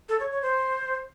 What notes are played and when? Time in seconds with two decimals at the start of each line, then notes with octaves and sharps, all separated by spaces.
0.09 A4
0.20 C#5
0.31 C#5
0.42 C5